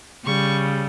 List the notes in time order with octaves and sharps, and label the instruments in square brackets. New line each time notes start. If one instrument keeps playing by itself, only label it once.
[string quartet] C#3 G3 C#6